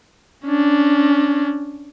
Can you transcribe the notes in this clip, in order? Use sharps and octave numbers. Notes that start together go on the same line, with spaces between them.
C#4 D4